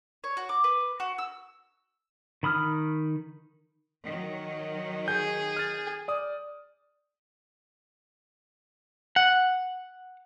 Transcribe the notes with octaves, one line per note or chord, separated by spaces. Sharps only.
C#5
F#4
D6
B4
F#4
E6
D#3 B5 D#6 F6
D#3 F#3
G#4 G6
F6 A6
D5 D#6
F#5